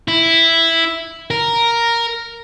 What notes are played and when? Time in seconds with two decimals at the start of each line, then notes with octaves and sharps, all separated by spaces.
0.08 E4
1.31 A#4